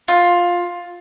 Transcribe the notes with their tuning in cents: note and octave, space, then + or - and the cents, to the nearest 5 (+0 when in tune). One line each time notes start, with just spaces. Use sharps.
F4 +10